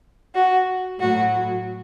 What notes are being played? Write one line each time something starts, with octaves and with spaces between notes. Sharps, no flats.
F#4
A2 F#3 F#4